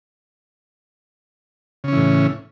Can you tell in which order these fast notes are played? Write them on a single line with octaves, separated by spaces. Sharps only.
C#3 C#4 E3 A2